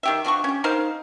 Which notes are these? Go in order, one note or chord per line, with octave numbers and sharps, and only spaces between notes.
D#3 G4 E5
F3 D4 F#4 C#6
C#4 G4
D#4 A#4 C5 F5